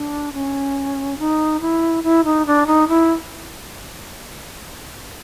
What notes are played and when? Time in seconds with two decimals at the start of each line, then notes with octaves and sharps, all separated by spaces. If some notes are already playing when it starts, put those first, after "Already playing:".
Already playing: D4
0.34 C#4
1.19 D#4
1.61 E4
2.04 E4
2.25 D#4
2.46 D4
2.67 D#4
2.88 E4